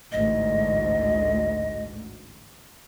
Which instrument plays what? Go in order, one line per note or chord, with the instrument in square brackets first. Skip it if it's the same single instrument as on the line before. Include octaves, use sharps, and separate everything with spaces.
[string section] A1 D2 G#2 [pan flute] D#5